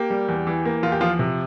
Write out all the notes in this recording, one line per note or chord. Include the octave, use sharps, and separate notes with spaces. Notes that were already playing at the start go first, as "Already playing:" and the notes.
Already playing: A#3 G4
G3
E2
E3
A#3
E2 F4
G4
F3 F4
C3